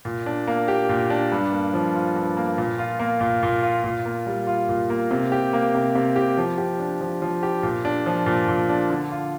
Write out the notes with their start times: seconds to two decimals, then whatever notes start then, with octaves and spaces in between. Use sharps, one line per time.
0.05 A#2
0.26 D4
0.47 A#3
0.68 G4
0.89 A#2
1.10 D4
1.32 G2
1.52 A#3
1.74 F3
1.95 F4
2.16 G2
2.37 A#3
2.58 A#2
2.78 F4
2.99 A#3
3.21 A#2
3.43 A#2
3.63 F4
3.84 A#2
4.06 A#3
4.26 G3
4.47 F4
4.69 A#2
4.90 A#3
5.11 C3
5.32 G4
5.53 A#3
5.75 C3
5.95 C3
6.16 G4
6.37 F3
6.58 G4
6.79 D4
7.01 F3
7.22 F3
7.43 G4
7.63 A#2
7.85 D4
8.06 F3
8.26 A#2
8.48 A#2
8.69 D4
8.90 D3
9.11 F4